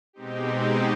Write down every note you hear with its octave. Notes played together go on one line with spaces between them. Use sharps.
B2 G#3 C4 D#4 G4